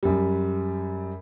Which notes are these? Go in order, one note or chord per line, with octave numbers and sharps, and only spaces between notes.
F#2 G3